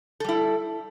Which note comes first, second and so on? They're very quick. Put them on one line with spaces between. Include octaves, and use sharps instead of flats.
A4 G3 E4